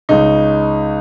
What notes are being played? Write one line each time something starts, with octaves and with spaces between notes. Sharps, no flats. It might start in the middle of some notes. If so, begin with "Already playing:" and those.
C#2 C#3 D#4